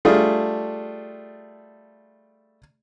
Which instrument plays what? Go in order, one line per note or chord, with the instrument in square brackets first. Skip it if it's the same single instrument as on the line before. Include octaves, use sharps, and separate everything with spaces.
[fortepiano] G3 A3 D4 F4 G#4